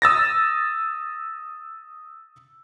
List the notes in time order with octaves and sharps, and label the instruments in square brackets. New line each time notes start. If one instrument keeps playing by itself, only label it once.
[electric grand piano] D#6 E6 A6 A#6